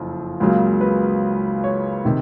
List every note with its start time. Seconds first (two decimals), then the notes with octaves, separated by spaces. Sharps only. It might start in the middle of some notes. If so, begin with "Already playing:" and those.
Already playing: F#1 F2
0.40 C#2 C#3 F#3 A#3
0.81 B4
1.64 C#5
2.05 C3 D#3